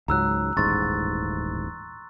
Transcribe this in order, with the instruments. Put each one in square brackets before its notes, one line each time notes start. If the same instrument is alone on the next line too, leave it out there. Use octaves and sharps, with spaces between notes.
[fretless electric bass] C#2 G#2 F#3 [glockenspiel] A#5 E6 F#6
[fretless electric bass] D#1 A1 G#2 [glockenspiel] C6 C#6 A6